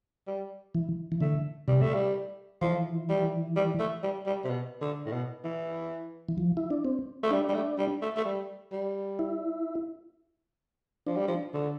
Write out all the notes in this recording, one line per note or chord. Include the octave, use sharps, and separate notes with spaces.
G3
E3
E3
D3 A3
C3 G3
A3
G3
E3 F3
G3
G3
A3
G3
G3
C3
B2
D3
A2
B2
E3
E3
F3
E4
D4
C4
A3
G3 D4
G3
A3
G3
A3
A3
G3
G3
E4
F3 D4
G3
F3
D3